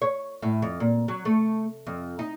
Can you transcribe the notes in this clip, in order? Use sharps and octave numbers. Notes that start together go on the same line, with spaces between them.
C#5
A2
F2
A#2
F#3
A3
F2
D#4